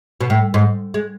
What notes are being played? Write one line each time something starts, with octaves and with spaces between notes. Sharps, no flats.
B2
A2
G#2
G#3